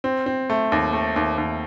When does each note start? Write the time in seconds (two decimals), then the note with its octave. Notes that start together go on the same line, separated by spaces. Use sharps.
0.04 C4
0.26 C4
0.50 A3
0.72 D#2
0.93 A3
1.16 D#2
1.38 D#2